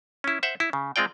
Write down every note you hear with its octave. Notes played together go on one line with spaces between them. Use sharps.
C#4 E4
C5 E5 F#5
E4
C#3
G#3 C4 F4 D5 G5